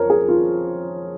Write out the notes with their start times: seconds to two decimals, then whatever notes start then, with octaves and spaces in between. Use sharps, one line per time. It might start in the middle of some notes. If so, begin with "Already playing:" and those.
Already playing: F2 A#4 C#5
0.10 G#4
0.29 F4